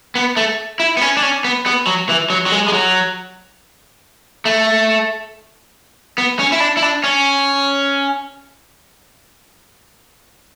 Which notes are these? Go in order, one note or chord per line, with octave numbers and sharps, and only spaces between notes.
B3
A3
E4
B3
C#4
D4
C#4
B3
B3
F#3
E3
F#3
F#3
G#3
G#3
F#3
A3
B3
C#4
E4
D4
E4
D4
C#4